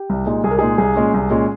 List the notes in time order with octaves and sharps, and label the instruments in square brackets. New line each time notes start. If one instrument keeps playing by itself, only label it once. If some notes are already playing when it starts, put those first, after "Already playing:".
Already playing: [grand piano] G4
C2
A#2 G#3 D#4
C2 G#4
A#4
A#2 G#3 D#4 G#4
C2 G#4
A#2 G#3 C#4
C2
A#2 G#3 C#4